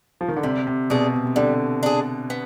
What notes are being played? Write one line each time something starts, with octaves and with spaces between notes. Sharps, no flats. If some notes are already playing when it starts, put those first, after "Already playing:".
F3
D#3
D3
C3 G3
C3
B2 D4 G#4
C3
C3
D3 G3
D4 G#4
B3